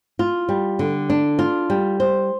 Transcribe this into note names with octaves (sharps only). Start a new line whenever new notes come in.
F4
G3
D3
D4
F4
G3
C5